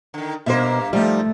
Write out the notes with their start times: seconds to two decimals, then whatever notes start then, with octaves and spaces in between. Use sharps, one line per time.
0.14 D3 D#3
0.46 G2 B2 A#3 C5 E5
0.93 F3 G3 A3 D#4